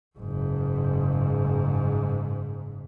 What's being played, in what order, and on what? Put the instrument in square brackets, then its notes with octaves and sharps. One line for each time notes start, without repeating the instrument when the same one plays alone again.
[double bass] F#1 G#2